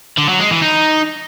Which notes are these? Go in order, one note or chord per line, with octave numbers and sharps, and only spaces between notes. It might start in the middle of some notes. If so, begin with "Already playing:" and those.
D3
F#3
G#3
E3
D#4